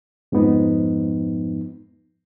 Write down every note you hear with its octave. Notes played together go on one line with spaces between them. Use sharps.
F2 G#2 F3 B3 D#4